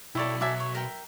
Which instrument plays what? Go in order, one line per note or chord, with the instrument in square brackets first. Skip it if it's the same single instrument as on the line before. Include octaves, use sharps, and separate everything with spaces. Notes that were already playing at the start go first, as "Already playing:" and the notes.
[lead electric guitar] B1 [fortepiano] E4 D5 [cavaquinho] A4 C#5 G5
[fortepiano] F#3 E5 [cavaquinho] D5 G#5 A5
[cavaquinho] C#5
A#4 G5